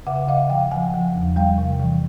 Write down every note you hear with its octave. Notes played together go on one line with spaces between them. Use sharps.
C#3 E5 F#5
C#3 D#5 F5
F3 F5 G5
F3 F#5 G#5
F3
E2
G3 F5 G5
C3
E3